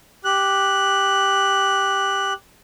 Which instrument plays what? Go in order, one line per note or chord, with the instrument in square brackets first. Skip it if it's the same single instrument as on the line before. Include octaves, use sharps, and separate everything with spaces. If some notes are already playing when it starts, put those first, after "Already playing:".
[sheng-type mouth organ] G4 F#6